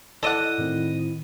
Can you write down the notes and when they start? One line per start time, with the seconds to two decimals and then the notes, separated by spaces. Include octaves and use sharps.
0.23 E4 A4 D5 D#5 F#5
0.58 A2 D#3 C4